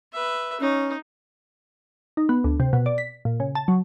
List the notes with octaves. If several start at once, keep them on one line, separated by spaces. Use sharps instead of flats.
B4 E5
C#4 D#4
D#4
B3
D2
C3
B2
D5
B6
A#2
C#3
A5
F#3